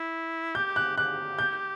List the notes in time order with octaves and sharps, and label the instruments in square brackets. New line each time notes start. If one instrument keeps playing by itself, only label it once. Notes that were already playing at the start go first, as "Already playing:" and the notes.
Already playing: [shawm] E4
[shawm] G4 [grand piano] G6
[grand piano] F#6
[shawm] G4 [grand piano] F#6
[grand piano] G6